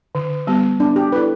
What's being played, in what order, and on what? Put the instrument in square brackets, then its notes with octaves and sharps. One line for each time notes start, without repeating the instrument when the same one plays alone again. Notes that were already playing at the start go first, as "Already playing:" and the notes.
[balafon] D3
G3 B3 G4
[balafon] B3 [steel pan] D4
[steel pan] G4
[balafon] E4 A4 D5 [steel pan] B4